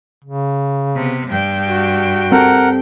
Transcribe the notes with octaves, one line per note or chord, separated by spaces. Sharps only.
C#3
C3 B3
G2 G5
F#4
C4 G4 A4 A#4 F#5